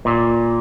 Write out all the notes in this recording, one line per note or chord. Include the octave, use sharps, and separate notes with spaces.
A#2